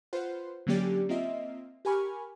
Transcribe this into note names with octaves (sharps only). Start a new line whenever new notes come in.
F4 B4 C5 F#5
D3 F#3 A#3 C#4 G4 D5
A#3 C4 F4 D#5 E5
G4 A#4 G#5 B5 C#6 F6